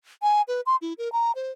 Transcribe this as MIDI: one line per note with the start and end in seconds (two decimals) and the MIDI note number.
0.22 0.42 80
0.48 0.61 71
0.66 0.76 84
0.81 0.93 64
0.98 1.12 70
1.12 1.32 82
1.35 1.51 72